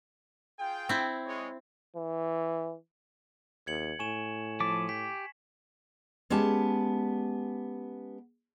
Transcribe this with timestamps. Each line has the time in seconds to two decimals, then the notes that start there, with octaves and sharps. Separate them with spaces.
0.59 F4 G#4 G5
0.89 C4 E4
1.26 G#3 C#5
1.96 E3
3.67 D#2 G#6 C#7 F#7
3.99 A2 G#5 C#6 E7
4.60 F3 A5 D6 B6
4.89 G4 B6
6.30 G#3 B3 C#4 G4 A5